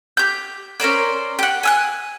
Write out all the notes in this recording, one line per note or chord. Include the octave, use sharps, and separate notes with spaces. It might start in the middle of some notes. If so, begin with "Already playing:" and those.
G4 G6
C#4 A#4 C5 D5
G4 F#5
G#5 E6 F#6